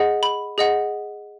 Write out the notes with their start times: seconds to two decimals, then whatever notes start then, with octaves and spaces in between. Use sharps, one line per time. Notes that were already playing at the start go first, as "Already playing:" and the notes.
Already playing: G#4 D#5 F#5
0.23 B5
0.58 G#4 D#5 F#5